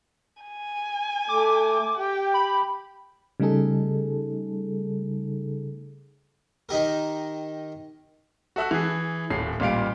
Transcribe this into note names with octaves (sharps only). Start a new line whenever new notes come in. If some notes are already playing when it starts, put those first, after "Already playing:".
G#5
A3 D6
G4 G5
B5
C#3 G3 A3 D#4 G#4 A4
D#3 D#4 G4 A#4
F#4 A4 E5 E6 F#6
E3 G#4
D#1 A2 C7
A1 A#2 G3 F5 D7